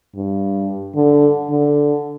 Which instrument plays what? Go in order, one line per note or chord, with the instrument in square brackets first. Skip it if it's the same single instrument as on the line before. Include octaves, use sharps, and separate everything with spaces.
[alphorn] G2
D3
D3